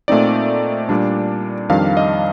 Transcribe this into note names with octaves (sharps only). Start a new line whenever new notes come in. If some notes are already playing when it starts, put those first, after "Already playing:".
A#2 A3 C4 D#4 D5
A#2 G3 D4
F2 D#3 G3 D4 F5
D#5